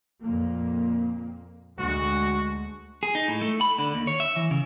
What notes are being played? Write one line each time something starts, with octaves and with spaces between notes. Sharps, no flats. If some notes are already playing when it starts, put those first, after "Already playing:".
F2 A#2 A#3
D2 G#3 F#4
G#4
D#4
A2
A3
B5
D3
D#2
C#5
E5
E3
C#3